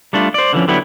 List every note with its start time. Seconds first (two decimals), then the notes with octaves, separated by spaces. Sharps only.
0.13 G3 A3 D4 F4
0.34 C5 D5
0.53 D3 E3 F3 C#4
0.68 D3 F#3 B3 E4 G4